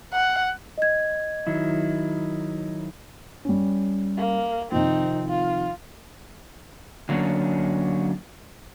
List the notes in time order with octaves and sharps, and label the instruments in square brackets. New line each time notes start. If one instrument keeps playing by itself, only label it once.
[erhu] F#5
[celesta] D#5 G#6
[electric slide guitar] D#3 F#3 E4
[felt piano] G3 C#4
[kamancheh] A#3
[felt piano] C3 D#3 F3 [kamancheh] C4 D#4
[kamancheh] F4
[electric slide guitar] D3 F#3 A#3 C#4 D4